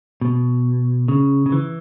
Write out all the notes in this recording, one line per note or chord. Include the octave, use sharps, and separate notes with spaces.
B2
C#3
C#3
E3